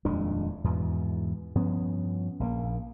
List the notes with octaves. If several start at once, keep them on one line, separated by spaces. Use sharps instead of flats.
D#1 F2 G#3 D4
E2 G#2 B2 E3
G2 F3 B3 C#4
A#1 D#3 A#3